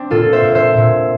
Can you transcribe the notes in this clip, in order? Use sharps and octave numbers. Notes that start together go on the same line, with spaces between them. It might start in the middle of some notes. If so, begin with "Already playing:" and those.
Already playing: C4 D4
A#2 F4 A4
C5 E5
A#2
C5 E5
A#2